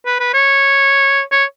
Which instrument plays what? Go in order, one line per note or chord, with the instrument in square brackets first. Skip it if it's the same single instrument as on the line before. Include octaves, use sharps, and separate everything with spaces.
[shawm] B4
B4
C#5
C#5